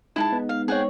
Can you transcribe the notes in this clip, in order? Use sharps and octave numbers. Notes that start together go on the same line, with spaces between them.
G#3 D#4 E4 G#5 A5
B3
F5
C4 G#4 C#5 F#5 G5